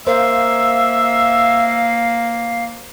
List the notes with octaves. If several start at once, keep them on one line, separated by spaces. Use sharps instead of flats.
A#3 A#4 C5 E5 F5